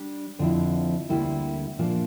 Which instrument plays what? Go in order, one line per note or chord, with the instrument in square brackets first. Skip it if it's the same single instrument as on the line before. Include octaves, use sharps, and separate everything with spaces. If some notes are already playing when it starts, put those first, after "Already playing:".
Already playing: [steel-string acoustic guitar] G3 D4
F2 D3 F3 C4 E4
D2 D3 G3 A#3 E4
A#2 F3 A#3 D4